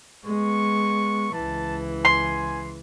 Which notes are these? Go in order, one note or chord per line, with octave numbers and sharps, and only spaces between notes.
G#3 B3 C#6
C#2 E3 A5
G#5 C6